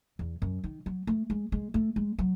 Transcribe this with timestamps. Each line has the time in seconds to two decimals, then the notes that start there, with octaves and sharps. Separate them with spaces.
0.19 E2
0.42 F#2
0.64 D#3
0.86 F#3
1.07 A3
1.30 G#3
1.52 G#3
1.74 A3
1.96 G#3
2.19 F#3